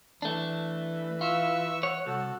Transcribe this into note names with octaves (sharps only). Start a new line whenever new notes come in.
E3 A3 D4
F4 E5 C#6 E6
C#5 F#5
C2 F#4 A4